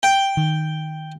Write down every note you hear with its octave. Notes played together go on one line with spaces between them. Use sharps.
G5
D#3